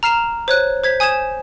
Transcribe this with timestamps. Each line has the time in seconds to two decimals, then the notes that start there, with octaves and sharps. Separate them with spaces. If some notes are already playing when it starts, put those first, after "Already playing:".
0.03 A#5 F6 C7 E7 F7
0.48 C5 C#5 F#6
0.84 C5 G#6 B6
1.00 G#5 D#6 G6 G#6 E7